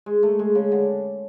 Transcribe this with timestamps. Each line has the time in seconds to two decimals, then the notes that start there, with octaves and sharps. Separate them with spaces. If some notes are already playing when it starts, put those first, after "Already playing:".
0.06 G#3
0.23 A3
0.39 G#3
0.55 C#3
0.72 D3